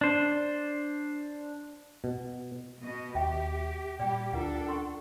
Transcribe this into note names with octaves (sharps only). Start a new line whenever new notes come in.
D4 C5
B2
B2 D#5
D#2 G4 E5 G5
A#2 G3 G4 D5 G5
D2 D4 F4 A4 A#4 F#5
C#4 C6 C#6